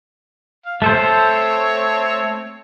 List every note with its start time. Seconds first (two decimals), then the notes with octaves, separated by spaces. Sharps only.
0.65 F5
0.82 A3 C4 A4 C5 C#5